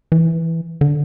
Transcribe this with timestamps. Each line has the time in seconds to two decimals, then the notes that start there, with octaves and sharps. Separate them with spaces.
0.12 E3
0.81 D3